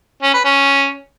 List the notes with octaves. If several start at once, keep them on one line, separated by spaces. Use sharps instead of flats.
C#4
B4
C#4